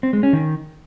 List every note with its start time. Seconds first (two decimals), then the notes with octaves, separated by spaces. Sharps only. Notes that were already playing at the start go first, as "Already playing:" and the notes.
0.03 C4
0.13 G#3
0.23 C#4
0.33 D#3